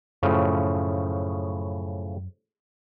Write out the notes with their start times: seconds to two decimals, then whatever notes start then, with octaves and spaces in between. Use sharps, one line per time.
0.23 F#2 A2 C#3 F3